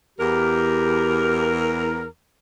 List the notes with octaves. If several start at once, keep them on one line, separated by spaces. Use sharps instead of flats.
E2 G4 A#4